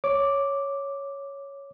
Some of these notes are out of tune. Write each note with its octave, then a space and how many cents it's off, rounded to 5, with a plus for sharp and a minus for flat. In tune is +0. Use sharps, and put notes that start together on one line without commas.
C#5 +0 D6 +0